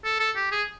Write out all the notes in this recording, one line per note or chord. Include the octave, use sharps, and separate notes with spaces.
A4
A4
G4
G#4